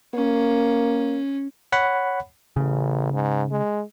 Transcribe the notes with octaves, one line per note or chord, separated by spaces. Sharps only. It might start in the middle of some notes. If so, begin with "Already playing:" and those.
A#3 C#4
C#5 F#5 B5
A1 C#3
G#2
G#3